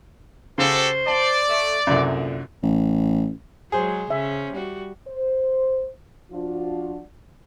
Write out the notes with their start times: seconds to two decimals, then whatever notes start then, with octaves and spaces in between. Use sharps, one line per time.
0.58 C#3 F#4 G4 A4 C5
1.07 D5 A5
1.48 A3
1.87 C2 F#2 A#2 D3
2.63 A1
3.72 F#3 G#3 G#4 C5
4.10 C#3 C#4 E5
4.53 G3 F#4
5.08 C5
6.32 F3 D4 F4 F#4